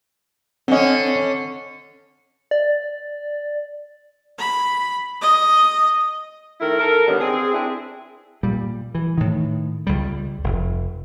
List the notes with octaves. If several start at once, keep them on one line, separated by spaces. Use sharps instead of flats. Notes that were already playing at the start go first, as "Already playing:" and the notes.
D3 C4 C#4 D#5
D5
B5
D#5
D#3 A3 E4 A#4
A4 A#4
D3 D#3 G3 B3 C#4
C4 G#4
C4 D4 E4 G#4
A#2 G3
E3
A2 D#3
C#2 G3
F1